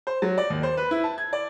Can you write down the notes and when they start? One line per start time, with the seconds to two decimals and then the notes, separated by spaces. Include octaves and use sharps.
0.07 C5
0.22 F#3
0.38 D5
0.50 D#2
0.63 C5
0.77 B4
0.91 E4
1.04 A5
1.18 G#6
1.33 D5